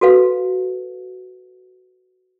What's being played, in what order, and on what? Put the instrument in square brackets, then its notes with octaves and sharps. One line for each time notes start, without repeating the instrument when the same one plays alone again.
[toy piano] F#4 A4 B4 F5